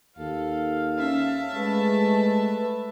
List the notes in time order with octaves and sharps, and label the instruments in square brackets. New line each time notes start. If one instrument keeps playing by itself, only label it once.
[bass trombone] D#2 [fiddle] A4 [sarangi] F5
[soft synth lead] C#4 [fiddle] E5 A5
[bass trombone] G#3 [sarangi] A3 [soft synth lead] B4